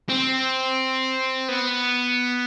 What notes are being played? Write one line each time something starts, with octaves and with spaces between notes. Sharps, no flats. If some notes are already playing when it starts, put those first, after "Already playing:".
C4
B3